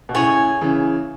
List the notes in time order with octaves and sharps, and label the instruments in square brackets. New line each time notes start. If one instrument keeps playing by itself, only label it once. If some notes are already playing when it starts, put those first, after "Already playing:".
[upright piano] B2
[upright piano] A2 C#3 [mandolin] G#4 C#5 G#5
[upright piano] C#3 E3